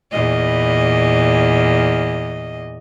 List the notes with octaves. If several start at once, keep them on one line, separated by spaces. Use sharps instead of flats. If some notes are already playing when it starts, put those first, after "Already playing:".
E2 A#2 D#5